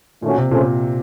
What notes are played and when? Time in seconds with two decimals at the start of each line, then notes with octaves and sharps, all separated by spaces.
0.22 A#2 D#3 A3 C#4 F#4
0.38 C3
0.51 A#2 C#3 A3 C#4 A4 C5